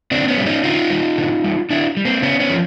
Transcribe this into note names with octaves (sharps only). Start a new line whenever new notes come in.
D3 C4 D4
B3 C#4
G3
C#4 D#4
D3 D#4 F4
G3
D3
G3
D3 D4 E4
G3
A#3 C4
C#3 B3 C#4
B3 C#4
F3